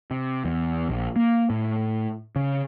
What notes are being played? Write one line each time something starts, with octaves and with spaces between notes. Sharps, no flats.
C3
E2
A#1
A#3
A2
C#3